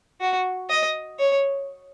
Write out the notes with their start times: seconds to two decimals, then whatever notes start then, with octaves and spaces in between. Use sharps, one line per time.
0.21 F#4
0.70 D#5
1.19 C#5